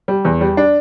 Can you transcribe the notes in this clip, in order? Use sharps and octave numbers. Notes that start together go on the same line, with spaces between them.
G3
E2
G3
D4